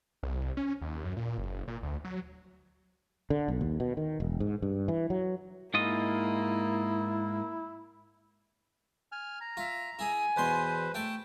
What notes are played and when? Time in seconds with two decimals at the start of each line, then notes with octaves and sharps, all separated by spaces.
0.23 C2
0.57 C#4
0.81 D#2
1.04 F#2
1.17 A#2
1.38 F#1
1.68 A#2
1.83 D2
2.05 F#3
3.30 D3
3.48 B1
3.61 D#2
3.80 B2
3.97 D#3
4.20 E1
4.40 G#2
4.62 G2
4.88 E3
5.10 F#3
5.74 G#2 A#3 E4 F4 D#5
9.12 G#5 F6
9.41 A#5
9.57 F4 E5
9.99 E4 G#4 G#5
10.37 E2 B2 B4 C5 C6
10.94 A3 G5 A5